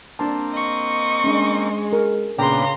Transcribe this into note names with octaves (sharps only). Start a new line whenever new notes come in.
A#3 C4 D4 A5
D#5 C#6
G#3 C#4 D4
A#4
A#2 C#3 B3 D4 G5 A#5 C6